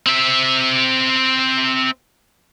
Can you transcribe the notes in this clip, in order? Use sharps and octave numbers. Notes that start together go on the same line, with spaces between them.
C4 E5